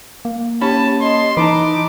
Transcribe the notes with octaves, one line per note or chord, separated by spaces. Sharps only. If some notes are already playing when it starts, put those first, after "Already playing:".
A#3
C#4 G4 A5 B5
D#5 C6
E3 D#4 B4 A5 A#5 D6